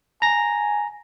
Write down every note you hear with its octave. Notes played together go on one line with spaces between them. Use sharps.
G#5 A#5 A#6